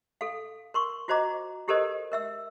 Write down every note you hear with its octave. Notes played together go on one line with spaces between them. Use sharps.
A4 F5
A#4 C6 C#6
F4 F#4 C5 D#5 A#5 D6
E4 G4 A4 A#4 C5 D#5
A#4 E5 E6